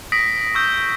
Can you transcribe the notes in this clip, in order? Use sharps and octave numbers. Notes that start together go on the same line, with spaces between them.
D#6 A#6 B6 D7
C#6 E6 G6